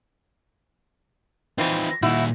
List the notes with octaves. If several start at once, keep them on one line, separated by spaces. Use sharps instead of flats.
F2 E3 C4 D#4 F4
A#2 D#3 D#4 E4 F#4